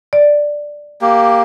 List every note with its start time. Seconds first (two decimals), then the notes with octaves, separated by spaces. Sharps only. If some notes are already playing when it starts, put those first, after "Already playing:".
0.13 D5
1.02 A#3 G4